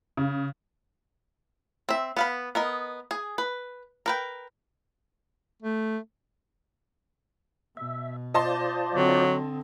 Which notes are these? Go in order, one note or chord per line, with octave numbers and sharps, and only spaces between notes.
C#3
C4 E5
B3 F5 B5
B3 A#4 D#5
G#4
B4
A#4 B4 G5
A3
B2 E5
F4 C5 D5 D#5 A5 C6
D3 F#3 C4